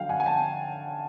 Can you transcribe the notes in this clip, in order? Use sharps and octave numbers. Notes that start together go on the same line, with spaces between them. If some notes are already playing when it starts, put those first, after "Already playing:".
Already playing: D3 F#3 F5 G5
F#5 G#5
G#5
G5 A5